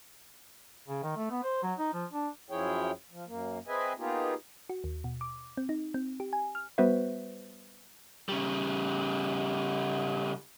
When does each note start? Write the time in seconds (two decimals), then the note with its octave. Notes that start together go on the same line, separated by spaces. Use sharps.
0.88 C#3
1.03 D#3
1.16 A3
1.31 B3
1.43 C5
1.63 F#3
1.78 D#4
1.93 F3
2.13 D4
2.50 F#2 F3 E4 G#4 C#5 G5
3.11 F3
3.27 F#2 A#3
3.67 C4 G#4 B4 D#5 E5 G#5
3.98 A#3 B3 D#4 F4 G4 G#4
4.69 F#4
4.84 D#2
5.04 B2
5.21 D6
5.57 C4
5.69 D#4
5.94 C4
6.20 G4
6.33 G#5
6.55 F6
6.78 G3 B3 F#4 B4 C5 E5
8.29 C#3 G3